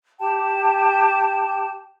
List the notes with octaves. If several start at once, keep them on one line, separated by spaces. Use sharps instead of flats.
G4 G5 A5